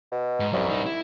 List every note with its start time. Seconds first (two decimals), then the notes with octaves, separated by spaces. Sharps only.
0.12 B2
0.40 G#2
0.53 C2 F#2
0.69 G3 D#4
0.86 E4